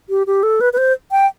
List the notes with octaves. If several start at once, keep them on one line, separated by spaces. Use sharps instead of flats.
G4
G4
A4
B4
B4
C5
G5